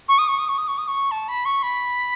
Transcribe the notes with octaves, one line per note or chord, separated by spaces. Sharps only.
C#6
D#6
C#6
D#6
C#6
D#6
C#6
D#6
C#6
A5
B5
C#6
B5